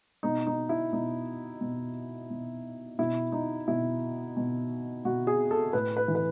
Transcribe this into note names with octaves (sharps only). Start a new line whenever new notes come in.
B2 D#4
D#4
E4
B2 D#4
B2
B2
B2 E4
D#4
B2 E4
B2
B2 F#4
G#4
A4
A2 B4
B4
E3
B4